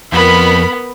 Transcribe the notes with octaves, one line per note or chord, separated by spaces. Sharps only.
F2 B3 A#4 B5